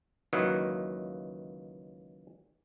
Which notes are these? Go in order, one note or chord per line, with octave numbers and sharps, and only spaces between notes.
C#2 D#3 E3 F#3 A#3